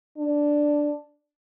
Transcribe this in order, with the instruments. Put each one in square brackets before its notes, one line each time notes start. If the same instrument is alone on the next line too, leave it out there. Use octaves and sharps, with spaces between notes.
[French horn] D4